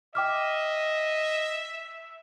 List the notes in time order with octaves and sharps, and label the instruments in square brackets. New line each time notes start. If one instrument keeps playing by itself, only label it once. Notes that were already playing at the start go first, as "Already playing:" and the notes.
[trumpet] D#5 [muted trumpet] E5 [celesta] G5 D6 F6